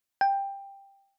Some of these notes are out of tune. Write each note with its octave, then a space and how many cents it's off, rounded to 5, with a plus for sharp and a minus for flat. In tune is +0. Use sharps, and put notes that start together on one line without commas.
G5 +10